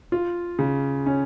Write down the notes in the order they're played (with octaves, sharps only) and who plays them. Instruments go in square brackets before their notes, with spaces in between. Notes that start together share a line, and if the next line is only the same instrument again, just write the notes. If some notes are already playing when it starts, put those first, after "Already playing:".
[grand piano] F4
C#3
C#4